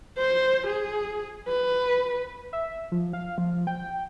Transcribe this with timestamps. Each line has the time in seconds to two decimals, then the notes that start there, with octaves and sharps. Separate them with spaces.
0.18 C5
0.67 G#4
1.48 B4
2.53 E5
2.92 F3
3.13 F5
3.38 F3
3.67 G5